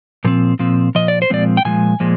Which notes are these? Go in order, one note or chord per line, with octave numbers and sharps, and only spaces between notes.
A#2 F3 C4
A#2 F3 C4
A#2 F3 D#5
D5
C5
A#2 F3 G#3 C4 D5
G5
A#2 F3 G#3 G#5
A#2 F3 G#3